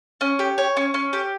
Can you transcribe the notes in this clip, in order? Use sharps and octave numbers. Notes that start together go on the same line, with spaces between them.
C#4
G4
C#5
C#4
C#4
G4